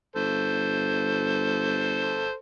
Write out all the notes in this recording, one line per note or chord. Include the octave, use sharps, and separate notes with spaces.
G1 A4 C5